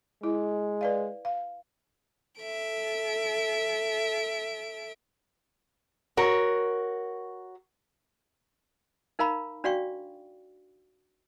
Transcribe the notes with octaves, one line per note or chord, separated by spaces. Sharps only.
G#3 E4
B4 D5 F5
F5
A4 E5 D7
F#4 A#4 C#5
D#4 A#4 F5 A#5 B5
D4 F#4 D5 F5 G5 C#6